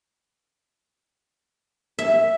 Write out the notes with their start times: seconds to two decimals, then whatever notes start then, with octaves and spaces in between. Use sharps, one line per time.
1.99 E5